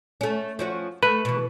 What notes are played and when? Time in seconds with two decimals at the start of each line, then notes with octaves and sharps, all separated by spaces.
0.21 A3 C#4
0.59 F3 C#4 F#4
1.03 A3 A4 B4
1.25 B2 E3